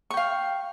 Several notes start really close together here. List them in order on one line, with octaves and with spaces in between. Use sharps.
C#6 G5 F5